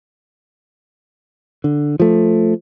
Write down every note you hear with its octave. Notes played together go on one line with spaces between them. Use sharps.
D3
F3 A3